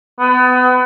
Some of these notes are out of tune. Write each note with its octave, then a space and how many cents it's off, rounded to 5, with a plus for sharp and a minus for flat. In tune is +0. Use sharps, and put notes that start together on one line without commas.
B3 +30